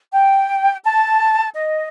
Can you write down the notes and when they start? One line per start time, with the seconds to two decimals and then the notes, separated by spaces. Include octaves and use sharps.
0.12 G5
0.84 A5
1.55 D#5